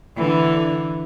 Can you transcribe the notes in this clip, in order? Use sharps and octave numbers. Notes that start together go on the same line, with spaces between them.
D3 E3